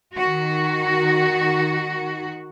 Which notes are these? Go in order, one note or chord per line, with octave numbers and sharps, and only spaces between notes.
D#3 F#4